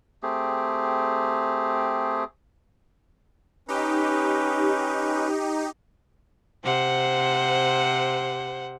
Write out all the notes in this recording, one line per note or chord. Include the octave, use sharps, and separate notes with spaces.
A3 C4 G4 G#4
C#4 D#4 G4 B4
C3 C5 F#5